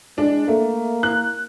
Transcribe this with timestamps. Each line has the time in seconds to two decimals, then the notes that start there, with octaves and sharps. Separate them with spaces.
0.18 G#3 D4
0.48 A3 A#3
1.03 F#6